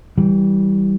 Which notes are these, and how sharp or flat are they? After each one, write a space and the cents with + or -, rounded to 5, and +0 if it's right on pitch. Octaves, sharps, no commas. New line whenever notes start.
E3 -25 G3 -15